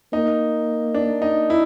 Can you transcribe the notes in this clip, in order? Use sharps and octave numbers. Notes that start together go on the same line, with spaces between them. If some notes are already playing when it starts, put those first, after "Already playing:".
A#3 D#4
D4
D#4
E4